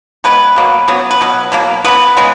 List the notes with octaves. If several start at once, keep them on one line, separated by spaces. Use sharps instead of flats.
C#3 G#3 B3 B4
B2 F#3 A#3
C#3 F#3 B3
B4
B2 F#3
B2 F#3 A#3
C#3 G#3 B3 B4
C#3 G#3 B3